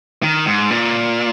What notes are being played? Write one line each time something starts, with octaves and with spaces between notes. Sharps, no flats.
D#3
G#2
A#2